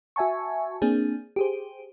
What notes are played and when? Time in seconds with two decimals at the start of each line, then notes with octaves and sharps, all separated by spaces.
0.16 F#4 E5 G#5 A5 C#6
0.82 A#3 C4 D4 G#4
1.36 G4 G#4 C5